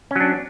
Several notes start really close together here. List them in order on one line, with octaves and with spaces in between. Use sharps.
C#4 F#3 D4